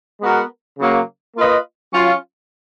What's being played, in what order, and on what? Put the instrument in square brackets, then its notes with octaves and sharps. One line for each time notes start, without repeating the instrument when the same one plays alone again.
[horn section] G#3 B3 F#4 A#4
C#3 F#3 A#3
A#3 F4 B4 D#5
F#3 C#4 F4